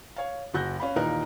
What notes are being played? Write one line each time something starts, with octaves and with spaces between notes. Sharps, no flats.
C#5 F5
F#1 F#4 F#6 G6 A#6
C#4 F5 B5
D#2 A#2 E3 D#4 A#4 F#6